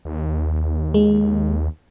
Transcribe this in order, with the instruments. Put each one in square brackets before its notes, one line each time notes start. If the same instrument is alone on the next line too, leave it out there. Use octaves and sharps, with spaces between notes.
[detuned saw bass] D#2
[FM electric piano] G#3